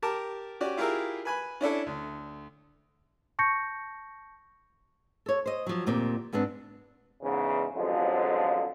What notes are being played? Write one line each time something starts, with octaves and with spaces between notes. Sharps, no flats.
G4 A#4 A5 D6
C#4 F#4 G4 D5
E4 F4 G4 G#4 A#4 E5
B4 G#5 B5
C#4 D4 E4 A4
D2
A5 C#6 G6 A#6 C#7
A4 C#5
C5 D#5
F3 F#3
D2 A#2 C4 G4
G#2 B3 C4 D4
E2 G#2 C#3
A1 F2 D3 F3 F#3 G#3